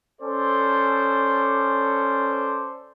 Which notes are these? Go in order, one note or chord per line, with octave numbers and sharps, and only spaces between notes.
C#4 A4 C5 D5